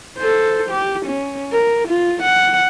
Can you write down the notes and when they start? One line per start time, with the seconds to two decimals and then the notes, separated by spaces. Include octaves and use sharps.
0.18 A4 C5
0.70 G4
1.06 C#4
1.53 A#4
1.88 F4
2.23 F#5